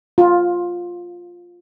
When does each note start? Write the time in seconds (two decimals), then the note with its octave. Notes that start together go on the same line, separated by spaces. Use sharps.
0.18 F4